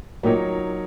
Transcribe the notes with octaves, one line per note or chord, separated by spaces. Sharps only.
A#2 D#3 F#3 D#4 A#4 C#5